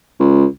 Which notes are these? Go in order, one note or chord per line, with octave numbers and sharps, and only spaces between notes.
C#2